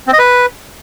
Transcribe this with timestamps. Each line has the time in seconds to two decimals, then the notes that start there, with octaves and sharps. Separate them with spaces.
0.07 C4
0.13 D#5
0.19 B4